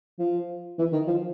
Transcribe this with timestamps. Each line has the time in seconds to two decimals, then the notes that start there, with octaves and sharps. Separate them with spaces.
0.19 F3
0.78 E3
0.92 D#3
1.07 F3